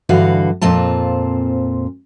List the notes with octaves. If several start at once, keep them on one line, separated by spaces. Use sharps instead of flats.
G2 D3 E3 F#4 F5
F2 A#2 C4 F4 A5